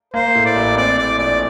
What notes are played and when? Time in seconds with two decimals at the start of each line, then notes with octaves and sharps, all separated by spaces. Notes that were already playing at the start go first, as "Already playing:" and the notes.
0.14 A#3 C5
0.35 A2
0.46 D5
0.56 A1
0.76 C4 D5
0.98 A2 D5
1.18 A#1 D5